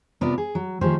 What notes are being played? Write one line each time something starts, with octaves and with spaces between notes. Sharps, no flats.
C3 B3 F4 A#4 D5
G#4
F#3
D#3 F3 A3 G4 G#4 C5